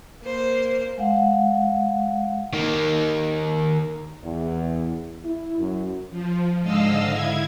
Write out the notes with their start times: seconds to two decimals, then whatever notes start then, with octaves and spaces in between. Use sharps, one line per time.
0.22 A#3 C5
0.98 G#3 F5 F#5
2.53 D#3 A#3
4.22 E2
5.24 E4
5.58 F#2
6.11 F3
6.62 G#2 D3 D#5 F5 E6
7.11 E4 G#6